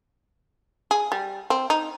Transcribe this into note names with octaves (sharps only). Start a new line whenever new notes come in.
G#4
G3
C4
D#4